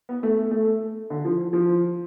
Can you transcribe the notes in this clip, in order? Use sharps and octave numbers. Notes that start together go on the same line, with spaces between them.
B3
A3
A3
D3
F3
F3